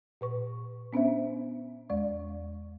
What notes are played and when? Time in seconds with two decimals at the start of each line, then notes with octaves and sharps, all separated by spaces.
0.21 A#2 B4 C#6
0.93 B3 C#4 D4 C5 E5
1.90 E2 G#3 D5 C#6